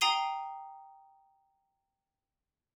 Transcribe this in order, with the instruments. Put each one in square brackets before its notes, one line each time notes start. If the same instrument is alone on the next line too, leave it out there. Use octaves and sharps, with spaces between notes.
[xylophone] G5 A#5 D#6 C7 D#7 G7